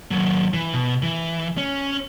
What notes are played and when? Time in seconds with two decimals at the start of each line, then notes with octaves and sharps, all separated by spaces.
0.11 D#2 F#3
0.54 E3
0.74 B2
1.02 E3
1.57 C#4